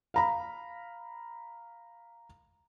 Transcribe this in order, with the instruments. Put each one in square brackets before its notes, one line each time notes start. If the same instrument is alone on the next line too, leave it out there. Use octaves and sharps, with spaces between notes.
[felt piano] F5 A#5 B5